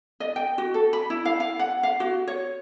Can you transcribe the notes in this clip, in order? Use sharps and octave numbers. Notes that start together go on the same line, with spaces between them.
D#5
G5
F#4
A4
B5
E4
F5
F5
F#5
F5
F#4
C#5